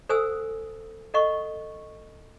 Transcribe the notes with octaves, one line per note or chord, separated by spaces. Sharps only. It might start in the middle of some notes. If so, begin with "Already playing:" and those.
A4 C5 F#5 G#5 D#6 E6
A4 D#5 F#5 C#6